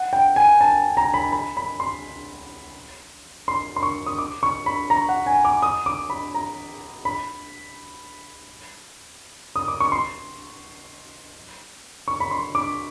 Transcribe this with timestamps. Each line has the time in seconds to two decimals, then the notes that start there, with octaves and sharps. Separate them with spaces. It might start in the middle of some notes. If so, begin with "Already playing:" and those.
Already playing: F#5
0.13 G5
0.36 G#5
0.61 A5
0.97 A#5
1.14 B5
1.32 B5
1.57 B5
1.80 C6
3.48 C6
3.76 C6
3.83 C#6
4.06 D#6
4.18 D6
4.43 C#6
4.66 B5
4.90 A#5
5.09 F#5
5.27 G#5
5.45 D6
5.62 D#6
5.86 D6
6.10 B5
6.35 A#5
7.05 B5
9.56 D#6
9.68 D6
9.80 C#6
9.92 C6
12.08 C#6
12.20 B5
12.31 C6
12.55 D6